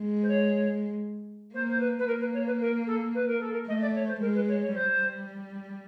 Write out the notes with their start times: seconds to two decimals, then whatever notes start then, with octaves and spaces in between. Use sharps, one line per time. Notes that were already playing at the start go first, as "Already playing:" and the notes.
Already playing: G#3
0.23 C5
0.28 C#5
1.53 A#3 C5
1.69 C5
1.80 B4
1.99 B4
2.07 A#3 A#4
2.20 B4
2.33 C#5
2.47 B4
2.61 A#4
2.87 A4
3.15 B4
3.28 A#4
3.40 A4
3.53 A#4
3.67 A3 D#5
3.81 D5
3.95 C#5
4.07 C5
4.21 G#3 A#4
4.35 B4
4.48 C#5
4.62 C#5
4.74 G3 C5